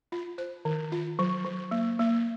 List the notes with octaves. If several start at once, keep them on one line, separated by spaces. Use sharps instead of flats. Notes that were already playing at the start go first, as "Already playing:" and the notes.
F4
C5
D#3
F4
F#3
F#3
A#3
A#3